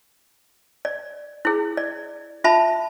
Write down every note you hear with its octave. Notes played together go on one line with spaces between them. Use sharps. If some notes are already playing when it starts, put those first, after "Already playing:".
D5
E4 G#4
D5
F4 E5 A5 B5